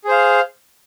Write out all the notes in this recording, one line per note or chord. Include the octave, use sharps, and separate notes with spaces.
G#4 C5 F5